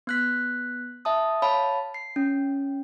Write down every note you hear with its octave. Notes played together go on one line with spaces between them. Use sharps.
B3 F#6 B6
E5 A5 D#6
C#5 F5 A5 B5
C7
C#4